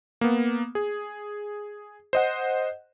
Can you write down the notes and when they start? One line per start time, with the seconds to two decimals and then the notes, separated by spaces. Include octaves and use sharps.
0.21 A#3 B3
0.75 G#4
2.13 C5 D#5 F#5